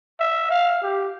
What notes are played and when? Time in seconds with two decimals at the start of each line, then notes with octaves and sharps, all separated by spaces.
0.20 E5
0.50 F5
0.82 G4